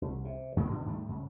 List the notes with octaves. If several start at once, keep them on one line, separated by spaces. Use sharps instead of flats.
C2
C3
G#2 C#3 G#3 A#3
B2 D3
G#2 D#3 G3 A3
G#2 C#3